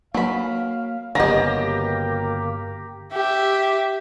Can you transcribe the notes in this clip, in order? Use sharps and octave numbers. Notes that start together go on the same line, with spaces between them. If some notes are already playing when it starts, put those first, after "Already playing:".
F#3 A#3 F5 B5
G1 C#3 F#3 A#3 B3 G4 D#5 A#5
G4 E5